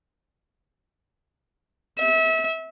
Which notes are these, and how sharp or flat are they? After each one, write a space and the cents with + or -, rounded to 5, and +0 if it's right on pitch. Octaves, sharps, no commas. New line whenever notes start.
E5 -30